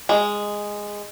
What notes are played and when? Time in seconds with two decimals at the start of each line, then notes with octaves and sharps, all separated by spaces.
0.09 G#3